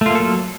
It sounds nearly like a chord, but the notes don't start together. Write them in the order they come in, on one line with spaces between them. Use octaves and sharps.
A3 F4 A#3 A4 F#3